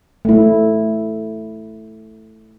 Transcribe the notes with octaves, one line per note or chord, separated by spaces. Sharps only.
A3 E4